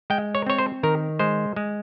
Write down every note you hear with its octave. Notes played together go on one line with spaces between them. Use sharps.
G#3 G5
C#5
C4 C#5
C5
D#3 A#4
G#3 C5
G#3